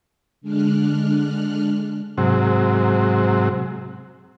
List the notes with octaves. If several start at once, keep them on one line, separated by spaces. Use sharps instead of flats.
D3 G#3 D4 F6 F#6
G#2 C3 F#3